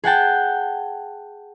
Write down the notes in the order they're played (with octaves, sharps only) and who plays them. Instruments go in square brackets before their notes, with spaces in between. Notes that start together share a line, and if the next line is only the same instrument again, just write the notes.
[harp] G#4 F#5 G5 A5